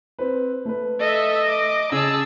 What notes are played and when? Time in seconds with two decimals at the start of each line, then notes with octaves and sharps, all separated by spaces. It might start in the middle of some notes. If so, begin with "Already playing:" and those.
0.19 C4 B4
0.65 A3 B4
1.00 A4 D#5 E5
1.47 D6
1.92 C#3 G#4 A5 E6